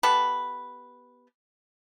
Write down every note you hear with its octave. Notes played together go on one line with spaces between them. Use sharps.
B3 G4 A4 B4